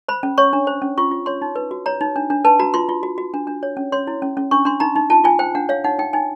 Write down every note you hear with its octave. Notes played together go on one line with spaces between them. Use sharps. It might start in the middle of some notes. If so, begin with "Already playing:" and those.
C5 B5
C#4
C#5 C#6
D4
C5
C#4
F4 C#6
F4
C#5 C6
D#4
B4
F#4
C#5 A#5
D#4
D4
D4
B4 A5
F#4 A#5
F4 C6
F4
F#4
F#4
D4
D4
C#5
C#4
C#5 C6
E4
C#4
C#4
D4 C#6
D4 C6
D#4 A#5
D#4
F4 A5
F4 G#5
C5 G5
D4 F#5
C#5 F5
D#4 F#5
D#4 G5
D#4 G#5